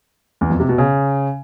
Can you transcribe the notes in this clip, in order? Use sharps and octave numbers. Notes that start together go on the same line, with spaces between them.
E2
F2
C3
B2
C#3